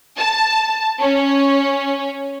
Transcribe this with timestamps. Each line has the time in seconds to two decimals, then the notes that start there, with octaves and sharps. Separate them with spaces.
0.17 A5
1.00 C#4